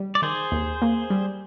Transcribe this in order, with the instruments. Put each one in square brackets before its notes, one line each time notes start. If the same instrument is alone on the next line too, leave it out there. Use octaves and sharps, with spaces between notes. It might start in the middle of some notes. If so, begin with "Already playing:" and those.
Already playing: [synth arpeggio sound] G3
[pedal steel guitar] D5
[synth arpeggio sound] D#3 [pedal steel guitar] G#4 C5
[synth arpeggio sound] D#2
A#3
G3